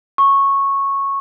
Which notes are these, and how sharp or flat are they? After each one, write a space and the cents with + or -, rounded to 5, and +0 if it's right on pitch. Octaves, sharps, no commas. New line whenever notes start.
C#6 -10